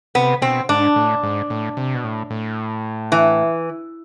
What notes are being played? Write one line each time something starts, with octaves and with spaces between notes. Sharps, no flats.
C3 B3
B2 C4
G#2 D4
A2
G#2
A2
C3
B2
A2
A2
E3